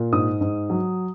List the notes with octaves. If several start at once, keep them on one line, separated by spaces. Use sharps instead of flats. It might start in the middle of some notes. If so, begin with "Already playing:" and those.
Already playing: A#2
G#2 D#6
G#2
F#3